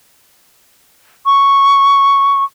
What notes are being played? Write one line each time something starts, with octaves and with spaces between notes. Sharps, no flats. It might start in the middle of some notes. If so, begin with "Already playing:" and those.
C#6